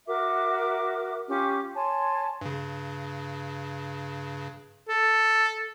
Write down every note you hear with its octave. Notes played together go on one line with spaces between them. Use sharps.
F#4 A#4 E5 D6
C#4 F4 G4 D6
C#5 G#5 A5 C6
G2 C#3
A4